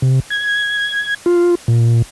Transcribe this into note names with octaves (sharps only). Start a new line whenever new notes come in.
C3
G#6
F4
A#2